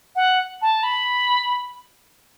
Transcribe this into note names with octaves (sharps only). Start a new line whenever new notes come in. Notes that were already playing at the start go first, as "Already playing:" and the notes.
F#5
A5
B5